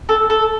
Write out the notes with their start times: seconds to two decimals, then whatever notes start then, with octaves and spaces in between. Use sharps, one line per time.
0.09 A4
0.30 A4